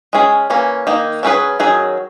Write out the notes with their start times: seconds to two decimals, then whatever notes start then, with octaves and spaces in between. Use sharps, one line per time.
0.13 G#3 C#4 G#4
0.50 E3 A#3 C#4
0.87 D#3 A#3 D#4
1.23 F#3 C#4 E4 G#4 B4
1.59 D#3 F#3 C#4 G#4